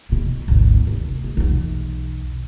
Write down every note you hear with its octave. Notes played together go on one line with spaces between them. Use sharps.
E2 B2
G#1 D2
F1
G#3
B1 E2